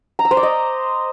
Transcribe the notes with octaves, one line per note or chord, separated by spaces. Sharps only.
A#5
E6
C5
D5
D#5